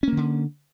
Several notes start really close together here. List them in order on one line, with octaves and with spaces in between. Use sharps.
C#4 A#3 D#3 D3